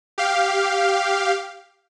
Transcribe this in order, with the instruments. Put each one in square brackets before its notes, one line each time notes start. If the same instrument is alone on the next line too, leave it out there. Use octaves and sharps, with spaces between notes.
[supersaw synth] G4 F5